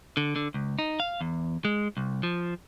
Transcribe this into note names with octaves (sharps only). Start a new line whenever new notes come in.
D3
D3
C#2
D#4
F5
E2
G#3
C2
F3